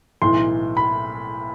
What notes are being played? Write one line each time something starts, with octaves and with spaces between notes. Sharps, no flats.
B1 A2 E3 C6
B5